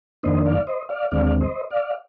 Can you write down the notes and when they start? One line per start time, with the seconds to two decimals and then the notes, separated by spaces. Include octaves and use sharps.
0.23 F2 D#3 A#3 D4 C5 D#5
0.46 D5 F5
0.67 C5 D#5
0.89 D5 F5
1.11 D#2 D3 G#3 C4 D5 F5
1.41 C5 D#5
1.70 D5 F5